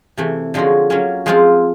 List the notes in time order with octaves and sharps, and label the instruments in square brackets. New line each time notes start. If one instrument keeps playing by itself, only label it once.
[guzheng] C3 E3 A3
D3 F3 G#3 C#4 F#4
F#3 A#3 C#4
F3 G#3 C4 F4